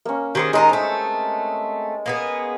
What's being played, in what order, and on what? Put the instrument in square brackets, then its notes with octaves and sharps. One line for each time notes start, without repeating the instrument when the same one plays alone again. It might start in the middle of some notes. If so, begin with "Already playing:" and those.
[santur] A#3 C#4
[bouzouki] D#3 G#4 C5 [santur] G4 C#5 D#6
[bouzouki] D#3 D#4 A#4 [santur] G#3
[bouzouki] A3 C4
A#3 B3 G#4